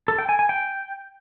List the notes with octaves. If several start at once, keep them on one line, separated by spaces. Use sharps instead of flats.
A4
G5
G#5
G#5
G5